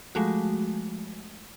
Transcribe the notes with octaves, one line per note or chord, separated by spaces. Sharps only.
F3 G#3 A3 F#4